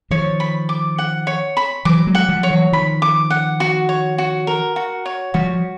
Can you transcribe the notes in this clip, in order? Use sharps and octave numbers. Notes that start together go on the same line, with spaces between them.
D#3 F3 C#5
B5
D6
F#5
C#5
B5
E3 F#3 D6
F#3 G#3
F#5
F3 G3
C#5
E3 F#3
D#3 F3 B5
D6
F#5
F#4
C#5
F#4
A#4
F#4
C#5
F3 G3 F#4